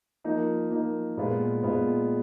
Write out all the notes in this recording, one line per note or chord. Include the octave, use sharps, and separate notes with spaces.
F3 A#3 D#4
F3 A#3 D#4
A#2 G#3 B3 F4
A#2 G#3 B3 F4